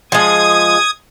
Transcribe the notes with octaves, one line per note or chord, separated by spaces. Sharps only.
F3 G#3 D#6 G#6